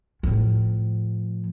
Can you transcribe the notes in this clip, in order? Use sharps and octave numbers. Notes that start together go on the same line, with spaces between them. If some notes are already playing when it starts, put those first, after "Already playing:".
A2 F3